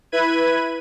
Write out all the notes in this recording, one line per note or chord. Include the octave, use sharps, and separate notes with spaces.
E4 B4 B5 G#6 D#7